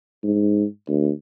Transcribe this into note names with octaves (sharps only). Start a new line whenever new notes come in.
G#2
D2